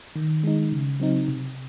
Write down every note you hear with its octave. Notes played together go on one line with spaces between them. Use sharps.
D#3
G#3 D#4
C#3
F#3 C4 D#4
C3